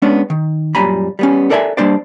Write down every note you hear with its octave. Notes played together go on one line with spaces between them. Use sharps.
G#3 B3 C#4 D4
D#3
F#2 A#2 G3 G#5 A#5 B5
G3 B3 C#4
A4 A#4 D5 E5 G5 G#5
G3 A#3 D4 C5 D5